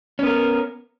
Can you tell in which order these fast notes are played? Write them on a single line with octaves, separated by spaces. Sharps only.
C#4 B3 A#4